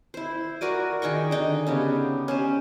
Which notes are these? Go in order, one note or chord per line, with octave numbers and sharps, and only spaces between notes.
E4 C5
F#4 A#4 D5 G#5
D#3 G#4 G5 C#6
D3 D#4
C#3 B3 G4
C#4 G4 C5